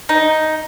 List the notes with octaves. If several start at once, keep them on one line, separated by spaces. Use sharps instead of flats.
D#4